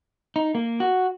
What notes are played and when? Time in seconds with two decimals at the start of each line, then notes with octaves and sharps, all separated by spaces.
0.36 D#4
0.55 A#3
0.80 F#4